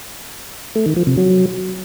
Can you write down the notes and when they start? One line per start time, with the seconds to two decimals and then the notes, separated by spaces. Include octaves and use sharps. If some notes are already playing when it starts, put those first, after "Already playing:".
0.75 A3
0.86 D#3
0.96 F3
1.07 C3
1.17 F#3